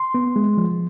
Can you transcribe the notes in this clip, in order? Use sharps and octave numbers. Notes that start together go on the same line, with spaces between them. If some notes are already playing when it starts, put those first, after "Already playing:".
Already playing: C6
B3
G#3
F3